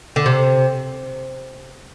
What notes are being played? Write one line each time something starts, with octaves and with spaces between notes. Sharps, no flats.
D3
C3